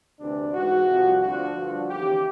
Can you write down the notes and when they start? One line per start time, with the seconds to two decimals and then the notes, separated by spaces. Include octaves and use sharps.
0.19 D2 C3 E3 D4
0.53 G#2 E3 F#4
0.87 C2 C3 F3
1.21 D2 D3 F3 F#4
1.55 G2 D3 F3
1.89 D#2 C#3 E3 G4